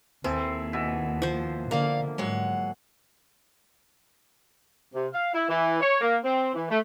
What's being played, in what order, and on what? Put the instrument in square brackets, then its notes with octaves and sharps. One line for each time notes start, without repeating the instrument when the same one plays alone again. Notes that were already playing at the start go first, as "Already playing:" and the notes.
[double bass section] D#2 [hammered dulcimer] E3 G#4 A4 [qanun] C4
[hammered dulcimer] B2 E3 E5
[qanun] F3 C5
[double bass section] D3 [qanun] A#3 [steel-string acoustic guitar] D5 F5 A#5
[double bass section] G#2 [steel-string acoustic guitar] F#3 G#3 F#5
[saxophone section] C3
F5
E4
E3
C#5
A#3
C4
E3
A3